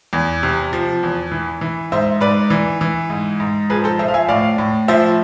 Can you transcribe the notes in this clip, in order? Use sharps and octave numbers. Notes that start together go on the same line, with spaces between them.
E2
C3
F3
E2
E3
E3
G#2 C5 E5
G#2 B4 D5
E3
E3
G#2
G#2
F3 G#4 B4
A4 C5
F3 C5 E5
F5
E5 G#5
A2 D5 F5
A2
F3 C5 E5